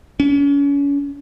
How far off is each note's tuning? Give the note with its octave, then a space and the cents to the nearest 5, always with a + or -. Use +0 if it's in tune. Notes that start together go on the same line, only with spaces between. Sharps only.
C#4 +35